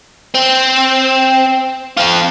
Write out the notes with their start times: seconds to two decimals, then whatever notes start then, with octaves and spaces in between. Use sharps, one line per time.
0.35 C4
1.97 C4 F4